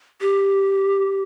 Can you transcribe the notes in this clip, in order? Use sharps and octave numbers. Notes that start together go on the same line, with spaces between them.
G4